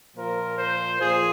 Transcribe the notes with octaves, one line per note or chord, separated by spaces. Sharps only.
A#2 F3 A#4
C5
A#2 F3 G#4